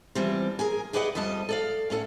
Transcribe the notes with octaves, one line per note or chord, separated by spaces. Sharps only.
E3 F3 G3 C4
G#4 A#4 G#5
G4 G#4 B4 D5 D#5 F#5
F2 F3 G3 D#5 A5
A4 D5 F5
A2 C#4 A4 F#5